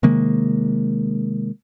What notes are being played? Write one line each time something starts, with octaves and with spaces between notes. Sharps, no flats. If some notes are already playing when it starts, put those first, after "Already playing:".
C3 D#3 G#3 A#3